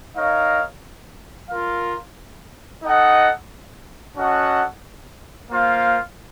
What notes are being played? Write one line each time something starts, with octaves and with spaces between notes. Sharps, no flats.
D#4 A#4 C#5 F5
F4 A#4 F5
D#4 A4 D#5 F#5
C#4 F#4 A4 D#5 F#5
A#3 F4 C5 F5